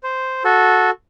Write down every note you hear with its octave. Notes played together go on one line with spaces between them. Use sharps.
C5
F#4 A4